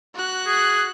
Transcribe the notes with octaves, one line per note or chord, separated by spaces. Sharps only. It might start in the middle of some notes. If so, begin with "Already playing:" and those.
F#4 F#6
G#4